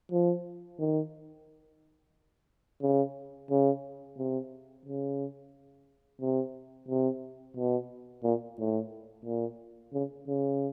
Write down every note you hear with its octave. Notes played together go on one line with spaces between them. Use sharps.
F3
D#3
C#3
C#3
C3
C#3
C3
C3
B2
A#2
A2
A#2
C#3
C#3